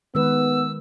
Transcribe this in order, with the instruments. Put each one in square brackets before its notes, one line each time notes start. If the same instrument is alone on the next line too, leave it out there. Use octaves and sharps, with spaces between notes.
[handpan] D#3 G#3 B4 [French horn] B3 [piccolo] E6